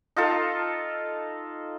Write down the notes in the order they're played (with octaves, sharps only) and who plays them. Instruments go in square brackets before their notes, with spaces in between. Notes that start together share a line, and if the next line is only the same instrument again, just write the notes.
[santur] D#4 F4 A4